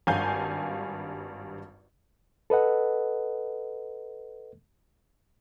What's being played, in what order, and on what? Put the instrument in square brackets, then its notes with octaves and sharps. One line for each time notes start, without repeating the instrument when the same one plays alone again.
[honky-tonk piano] G#1 G2 F5 G#5 G6
[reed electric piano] A4 B4 D#5 F#5